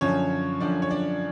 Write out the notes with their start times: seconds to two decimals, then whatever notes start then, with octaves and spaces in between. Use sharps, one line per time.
0.01 F#2 D3 F3 C#4 C#5
0.61 F#2 D3 F3 D4 D5
0.82 C#5
0.90 D4 D5